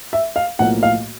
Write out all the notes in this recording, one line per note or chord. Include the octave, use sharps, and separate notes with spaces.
E5
F5
B1 A2 F3 A#3 F#5
F5